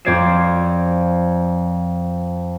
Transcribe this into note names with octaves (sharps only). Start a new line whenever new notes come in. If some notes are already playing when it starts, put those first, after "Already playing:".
F2 C4 D5 G#6 C7 E7